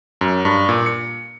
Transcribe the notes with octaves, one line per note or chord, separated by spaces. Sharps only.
F#2
G2
A#2
C#7